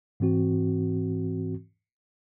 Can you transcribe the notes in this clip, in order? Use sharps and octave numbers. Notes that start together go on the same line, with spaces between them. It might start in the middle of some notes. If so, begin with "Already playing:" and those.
G#2 E3 C4 F#4